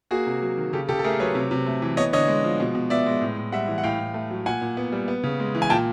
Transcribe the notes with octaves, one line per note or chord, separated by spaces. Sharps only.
A#3 F#4 G#4
C3
F#3
D#3
C#3 G4 A4
C#3 G4 A4
A4
A3 G#4 A#4
F#3 B4 C#5
C3
C3
A3
E3
B3 C#5 D#5
D3 C#5 D#5
G#3
F3
B2
B2
B3 D5 E5
G#3
A2
A2
G3 E5 F#5
E3
F#5
A2 F5 G5
A2
A3
F#3
A#2 F#5 G#5
A#2
B3
G3
B3
C#3
G#3
E3
G#5
A#2 G5 A5